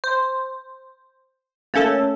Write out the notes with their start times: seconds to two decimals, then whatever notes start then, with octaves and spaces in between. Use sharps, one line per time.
0.04 C5
1.74 A3 A#3 C#4 A4 A5